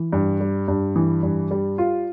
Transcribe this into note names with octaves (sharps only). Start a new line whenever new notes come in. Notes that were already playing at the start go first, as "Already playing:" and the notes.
Already playing: E3
G2
G3
G2
E3
G2
G3
F4